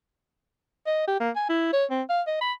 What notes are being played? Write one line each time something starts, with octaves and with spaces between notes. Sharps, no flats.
D#5
G4
A#3
G#5
E4
C#5
C4
F5
D#5
B5